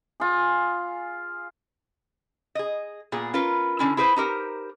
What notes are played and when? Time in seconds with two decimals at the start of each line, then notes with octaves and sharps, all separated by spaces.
0.20 F4 G#4
2.55 G#4 D#5
3.12 A#2 B3 G#4
3.34 C#4 F4 A#4 B4
3.79 D3 C#4 E4
3.97 E4 G#4 B4 C5
4.16 D#4 G4 A#4 C5